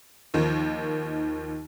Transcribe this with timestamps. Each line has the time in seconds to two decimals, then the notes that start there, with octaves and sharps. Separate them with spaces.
0.34 D#2 D#3 F3